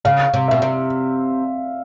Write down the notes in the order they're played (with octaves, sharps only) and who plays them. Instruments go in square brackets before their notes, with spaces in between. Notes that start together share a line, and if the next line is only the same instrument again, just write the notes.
[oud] C#3 [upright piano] F5
[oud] C3
[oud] B2 [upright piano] E5
[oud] C3